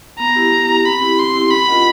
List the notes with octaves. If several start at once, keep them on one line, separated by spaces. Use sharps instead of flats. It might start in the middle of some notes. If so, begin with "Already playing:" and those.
B3 A#5
E4 G4
B3
E4 G4
C4 B5
E4 G4
C4 C6
E4 G4
C#4 B5
F4 A#4 D#5 F#5